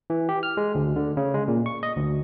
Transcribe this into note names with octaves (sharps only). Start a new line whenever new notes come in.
E3
G4
F6
G#3
D2
D3
C#3
G#3
A#2
C#6
D#5
D2